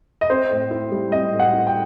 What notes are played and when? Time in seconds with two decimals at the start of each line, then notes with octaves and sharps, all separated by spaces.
0.21 D#5
0.30 C4 C5
0.51 A2
0.71 E4
0.91 G3
1.12 C4 D#5
1.33 A2
1.40 F#5
1.53 E4
1.67 G5